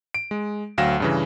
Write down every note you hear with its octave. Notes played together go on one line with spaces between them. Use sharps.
D7
G#3
D2 F#3 F5 G5 A#6 E7
G2 C#3 E3